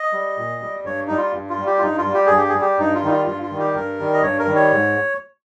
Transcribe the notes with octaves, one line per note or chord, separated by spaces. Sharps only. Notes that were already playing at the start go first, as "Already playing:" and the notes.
Already playing: D#5
G3
A#2
G3
G2 C#5
G3 D#4
F4
G2
F4
G3
G4
F4
G2 D#4
F4
G3
G4
G2 G#4
G4
G#4
G3
G4
G2 D#4
F4
D#3 G3 D#4
F4
G2 F4
F4
D#3 G3
G4
G2 A#4
D#3 G3
D#5
G2 C#5
A#4
D#3 G3
C#5
G#2